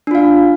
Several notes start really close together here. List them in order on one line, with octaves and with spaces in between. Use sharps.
D4 F4 F5